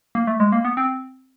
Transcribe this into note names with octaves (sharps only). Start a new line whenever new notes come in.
A#3
A3
G#3
A#3
B3
C4